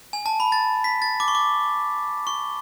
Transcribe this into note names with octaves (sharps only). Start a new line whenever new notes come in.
G#5
A5
B5
A6
B6
A6
D6
C#6
D6
C#6